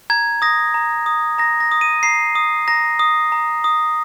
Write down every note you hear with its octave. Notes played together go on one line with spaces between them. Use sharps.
A#5 G#6
D#6 A#6
A#5
D#6
A#5 A#6
A#6
D#6
D#7
A#5 C7
D#6
A#5 A#6
D#6
A#5
D#6